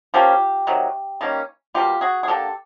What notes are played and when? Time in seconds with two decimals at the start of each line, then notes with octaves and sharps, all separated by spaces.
0.14 F3 A#3 C#4 F4 G4
0.67 C3 D#3 F#3
1.21 D#3 G3 A#3 C#4
1.74 B2 G3 A#3 F4 G4
2.01 F#4 G#4
2.23 G#4
2.28 D3 F#3 A#3 G4 A4